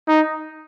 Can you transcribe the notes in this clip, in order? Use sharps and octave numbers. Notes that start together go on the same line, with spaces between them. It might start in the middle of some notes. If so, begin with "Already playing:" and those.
D#4